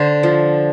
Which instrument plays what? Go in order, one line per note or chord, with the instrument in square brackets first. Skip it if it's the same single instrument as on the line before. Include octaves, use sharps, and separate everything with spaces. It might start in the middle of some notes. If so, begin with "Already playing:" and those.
Already playing: [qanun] D3 C5
F3